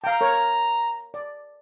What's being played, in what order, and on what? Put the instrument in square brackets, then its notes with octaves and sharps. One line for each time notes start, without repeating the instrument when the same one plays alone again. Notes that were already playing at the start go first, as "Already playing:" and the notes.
[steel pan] F5 G5 [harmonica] A#5
[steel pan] A#4 C#5
D5